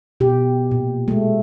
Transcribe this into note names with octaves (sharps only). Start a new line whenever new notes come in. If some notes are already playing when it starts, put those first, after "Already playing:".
B2 G4
A#2
G#3 A3